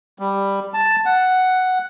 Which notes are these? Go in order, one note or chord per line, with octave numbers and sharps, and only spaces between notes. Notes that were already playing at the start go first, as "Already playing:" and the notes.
G3
A5
F#5